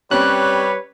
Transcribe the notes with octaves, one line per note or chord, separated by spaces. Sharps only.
G3 C4 C#4 B4 C#5 F#6